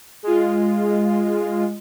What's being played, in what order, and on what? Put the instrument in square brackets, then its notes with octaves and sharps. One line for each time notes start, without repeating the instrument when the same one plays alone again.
[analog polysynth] G#3 F4